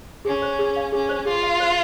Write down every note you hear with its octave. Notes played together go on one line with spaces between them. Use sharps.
C#4 G#4
C5
G#4
F5
C#4 G#4
C5
F4 G#4
F5
C5